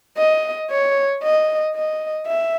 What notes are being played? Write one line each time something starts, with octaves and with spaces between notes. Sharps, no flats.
D#5
C#5
D#5
D#5
E5